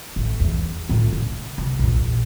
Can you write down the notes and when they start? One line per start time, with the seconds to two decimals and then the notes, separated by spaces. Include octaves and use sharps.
0.16 A1
0.40 E2 E3
0.89 A2 F3
1.13 C#3
1.58 C3
1.79 A#1 E2